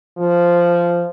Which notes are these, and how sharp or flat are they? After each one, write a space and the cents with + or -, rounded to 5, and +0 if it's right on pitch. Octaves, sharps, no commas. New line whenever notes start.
F3 -10